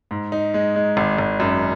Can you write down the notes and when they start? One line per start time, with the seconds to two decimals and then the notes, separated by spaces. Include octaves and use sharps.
0.11 G#2
0.32 D#4
0.54 G#3
0.76 G#3
0.97 G#1
1.18 G#1
1.40 F#2